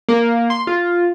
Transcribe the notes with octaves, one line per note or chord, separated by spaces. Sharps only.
A#3
C6
F4